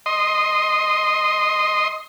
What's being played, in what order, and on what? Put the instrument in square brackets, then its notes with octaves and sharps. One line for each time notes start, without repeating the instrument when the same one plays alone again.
[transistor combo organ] D#5 C6